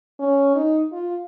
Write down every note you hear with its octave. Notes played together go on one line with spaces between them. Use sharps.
C#4
D#4
F4